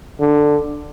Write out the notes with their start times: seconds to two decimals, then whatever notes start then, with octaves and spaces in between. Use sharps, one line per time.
0.20 D3